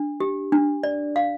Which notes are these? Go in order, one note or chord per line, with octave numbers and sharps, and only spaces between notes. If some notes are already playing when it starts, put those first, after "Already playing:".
Already playing: D4
G4
D4
D5
F5